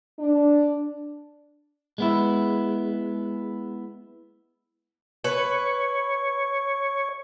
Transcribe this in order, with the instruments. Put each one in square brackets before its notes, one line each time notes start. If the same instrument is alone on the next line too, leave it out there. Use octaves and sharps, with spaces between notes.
[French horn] D4
[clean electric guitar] G#3 B3 E4
[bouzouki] B4 [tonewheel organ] C#5